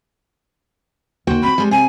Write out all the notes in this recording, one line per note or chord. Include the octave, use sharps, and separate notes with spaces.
D#2 D#3 F#4 C5 G5
F3 C4 B5
G3 G#3 C5
C3 G#5